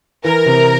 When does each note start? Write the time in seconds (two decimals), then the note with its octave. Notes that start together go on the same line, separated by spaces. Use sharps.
0.24 E3 A#4
0.46 C3